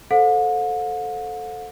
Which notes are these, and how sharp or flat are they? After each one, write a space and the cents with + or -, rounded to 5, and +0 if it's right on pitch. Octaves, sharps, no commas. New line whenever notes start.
A4 +0 C5 +0 F#5 -45